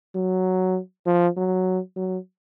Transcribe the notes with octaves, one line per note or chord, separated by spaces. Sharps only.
F#3
F3
F#3
F#3